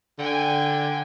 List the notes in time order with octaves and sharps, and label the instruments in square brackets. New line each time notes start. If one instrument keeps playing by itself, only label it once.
[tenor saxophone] D3 [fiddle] G5 G#5